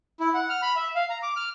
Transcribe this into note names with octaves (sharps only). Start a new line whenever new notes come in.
E4
F#5
F6
B5
E5
F5
A#5
D6
F6